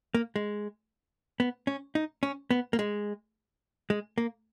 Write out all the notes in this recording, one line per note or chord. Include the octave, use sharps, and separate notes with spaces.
A#3
G#3
B3
C#4
D#4
C#4
B3
A#3
G#3
G#3
A#3